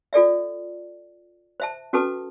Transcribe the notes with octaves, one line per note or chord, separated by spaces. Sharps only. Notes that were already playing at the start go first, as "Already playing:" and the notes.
F4 A4 D5 E5
C5 E5 A5
C#4 F#4 A4 B4 A5 D6